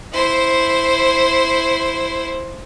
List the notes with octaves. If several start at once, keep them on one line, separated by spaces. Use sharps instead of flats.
E4 C5